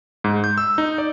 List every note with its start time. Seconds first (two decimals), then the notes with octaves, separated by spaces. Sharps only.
0.24 G#2
0.44 G6
0.58 E6
0.78 D#4
0.98 D5